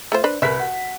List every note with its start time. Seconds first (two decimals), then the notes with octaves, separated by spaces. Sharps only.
0.12 A3 F4 C5
0.24 D4 B4 C5
0.42 C2 A#4 B4 E5 B6
0.60 F#4